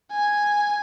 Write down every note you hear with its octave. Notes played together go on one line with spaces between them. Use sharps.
G#5